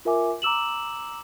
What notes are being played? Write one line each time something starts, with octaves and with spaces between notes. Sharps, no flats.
F4 A#4 E5 G#5 D6
A#5 D6 E6 E7 F#7